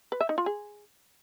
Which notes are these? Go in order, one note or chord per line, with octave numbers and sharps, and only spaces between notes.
B4
E5
D#4
F4
G#4